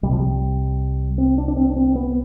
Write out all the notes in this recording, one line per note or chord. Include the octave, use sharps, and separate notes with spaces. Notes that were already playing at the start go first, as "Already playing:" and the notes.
C2 C3 G3
F3
G3
C4
D4
D4
C4
D4
C4
B3